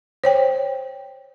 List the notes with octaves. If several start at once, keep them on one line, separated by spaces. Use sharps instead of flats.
C5 C#5 G5